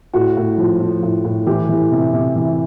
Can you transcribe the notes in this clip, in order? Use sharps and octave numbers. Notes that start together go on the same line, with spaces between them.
A2 F#4
A2
F3
F3
A2
A2
E3 G4
E3
C3
C3
E3